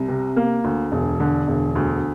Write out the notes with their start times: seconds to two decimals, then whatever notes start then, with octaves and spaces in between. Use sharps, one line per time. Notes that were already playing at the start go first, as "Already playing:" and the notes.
Already playing: C2
0.08 C3
0.36 A#3
0.64 D2
0.92 E1
1.20 D3
1.48 E1
1.75 D2